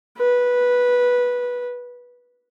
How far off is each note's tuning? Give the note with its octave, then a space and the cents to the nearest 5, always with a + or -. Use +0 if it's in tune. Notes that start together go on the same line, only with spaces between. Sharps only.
B4 -10